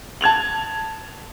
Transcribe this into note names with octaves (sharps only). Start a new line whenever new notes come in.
A5 G#6 F7 F#7